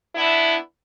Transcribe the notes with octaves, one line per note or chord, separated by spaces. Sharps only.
B3 D4 E4